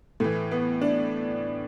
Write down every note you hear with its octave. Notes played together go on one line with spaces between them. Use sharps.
A2 E3 A3
B3
D4